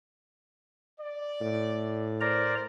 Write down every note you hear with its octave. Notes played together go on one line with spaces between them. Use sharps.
D5
A2
A#4 C5 D5 A#5